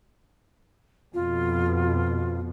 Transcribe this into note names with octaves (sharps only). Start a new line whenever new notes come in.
F2 B2 F4